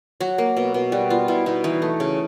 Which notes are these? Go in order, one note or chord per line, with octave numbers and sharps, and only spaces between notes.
F#3 F#4
A#3
B2
B2
G3 F#4
B3 F4
B2 E4
B2 D#4
E3 D#4
A3
C#3